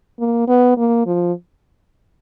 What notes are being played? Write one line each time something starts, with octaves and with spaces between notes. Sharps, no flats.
A#3
B3
A#3
F3